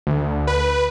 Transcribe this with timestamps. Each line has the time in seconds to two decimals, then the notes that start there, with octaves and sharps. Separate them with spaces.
0.07 D2
0.47 B4